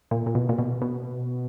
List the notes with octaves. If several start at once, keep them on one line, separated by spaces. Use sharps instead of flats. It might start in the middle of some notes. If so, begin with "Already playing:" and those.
A#2
A#2
B2
A#2
B2
B2